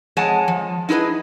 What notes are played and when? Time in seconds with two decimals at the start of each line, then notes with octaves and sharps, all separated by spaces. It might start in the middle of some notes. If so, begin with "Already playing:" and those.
0.17 F2 G#3 C#5 F#5 G#5 A5
0.48 F3
0.89 D#4 E4 G#4 B4 D#5